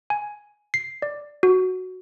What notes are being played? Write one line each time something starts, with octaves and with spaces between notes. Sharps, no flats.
G#5
C7
D5
F#4